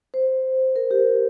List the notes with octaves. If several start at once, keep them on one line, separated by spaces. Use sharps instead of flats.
C5
A#4
G4